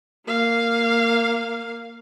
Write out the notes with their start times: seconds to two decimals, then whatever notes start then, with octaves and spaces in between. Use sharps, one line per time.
0.26 A#3 F5